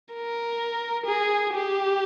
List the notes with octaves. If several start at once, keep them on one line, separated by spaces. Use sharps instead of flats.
A#4
G#4
G4